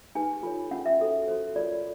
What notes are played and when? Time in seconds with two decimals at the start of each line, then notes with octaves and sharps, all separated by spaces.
0.15 D#4 G4 B4 G#5
0.43 F4 A4 C#5
0.71 C#4 F4 G#4 F#5
0.86 E5
0.99 F#4 A4 C5
1.28 F#4 A4 C5
1.56 F4 A#4 C#5 D5